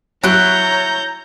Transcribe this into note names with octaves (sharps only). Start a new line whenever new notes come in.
F#3 E4 C#5 A#5 F#6 G6